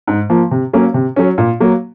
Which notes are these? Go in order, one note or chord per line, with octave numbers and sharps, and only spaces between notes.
G#2
F3 A#3
C3
F#3 A#3 C#4
C3
F#3 C#4
A#2
F#3 A#3